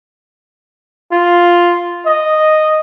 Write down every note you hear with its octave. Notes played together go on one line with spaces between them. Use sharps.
F4
D#5